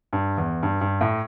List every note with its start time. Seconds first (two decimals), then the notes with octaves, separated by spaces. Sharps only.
0.13 G2
0.38 E2
0.63 G2
0.81 G2
1.01 A2